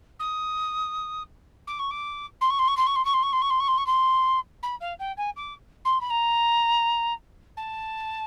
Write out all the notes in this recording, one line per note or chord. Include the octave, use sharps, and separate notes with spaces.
D#6
D6
C#6
D6
C6
C#6
C6
C#6
C6
C#6
C6
C#6
C6
C#6
C6
C#6
C6
C#6
C6
C#6
C6
B5
F5
G5
G#5
D6
C6
B5
A#5
A5